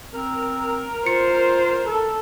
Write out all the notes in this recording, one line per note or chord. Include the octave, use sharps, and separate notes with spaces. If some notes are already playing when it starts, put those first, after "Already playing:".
C4 A#4
F4 C5 C#7
A4